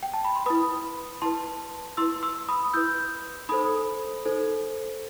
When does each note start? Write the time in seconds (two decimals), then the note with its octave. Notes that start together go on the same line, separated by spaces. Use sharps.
0.03 G5
0.14 A5
0.25 B5
0.36 C6
0.46 E4 B4 B5 D#6
1.22 E4 B4 A5 C6
1.97 E4 B4 C6 E6
2.23 C6 E6
2.49 B5 D#6
2.73 E4 B4 E6 G6
3.49 D#4 A4 C5 B5 D#6
4.25 D#4 A4 C5